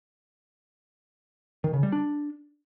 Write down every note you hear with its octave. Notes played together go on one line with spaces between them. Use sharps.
D#3
C#3
G3
D4